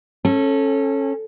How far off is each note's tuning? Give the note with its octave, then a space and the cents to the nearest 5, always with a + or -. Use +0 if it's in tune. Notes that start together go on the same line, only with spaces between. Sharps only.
C#4 -25 A4 +0